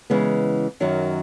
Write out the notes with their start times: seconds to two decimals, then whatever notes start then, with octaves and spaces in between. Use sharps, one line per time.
0.10 C#3 E3 G#3 B3
0.80 F#2 D#3 F#3